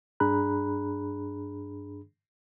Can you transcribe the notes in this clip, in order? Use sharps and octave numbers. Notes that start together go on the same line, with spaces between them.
G2 D4 G#4 A#5 B5 F#6